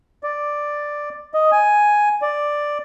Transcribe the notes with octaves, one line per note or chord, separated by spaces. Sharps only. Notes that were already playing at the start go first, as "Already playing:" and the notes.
D5
D#5
G#5
D5